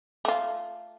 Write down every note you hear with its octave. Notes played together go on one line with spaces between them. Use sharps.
A3 F4